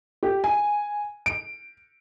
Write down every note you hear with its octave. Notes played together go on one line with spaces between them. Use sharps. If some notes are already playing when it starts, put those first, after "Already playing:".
G4
G#5
D7